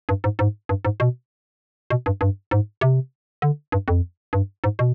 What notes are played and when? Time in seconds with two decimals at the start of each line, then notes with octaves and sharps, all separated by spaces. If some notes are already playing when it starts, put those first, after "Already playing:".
0.09 G2
0.24 G#2
0.39 G#2
0.69 G2
0.85 G#2
1.00 B2
1.90 B2
2.06 G2
2.21 G2
2.51 G#2
2.81 C3
3.42 D3
3.72 G2
3.88 F2
4.33 G2
4.64 G#2
4.79 B2